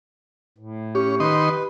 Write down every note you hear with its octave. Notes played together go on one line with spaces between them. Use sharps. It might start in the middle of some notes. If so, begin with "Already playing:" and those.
A2
C#4 G4
D#3 D#4 B4 C6